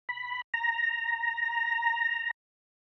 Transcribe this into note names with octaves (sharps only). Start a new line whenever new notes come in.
B5
A#5